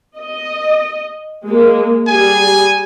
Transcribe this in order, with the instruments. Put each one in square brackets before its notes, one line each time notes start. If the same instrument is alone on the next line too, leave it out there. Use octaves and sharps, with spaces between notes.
[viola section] D#5
G#3 A#3
[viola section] G3 G#4 [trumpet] G#5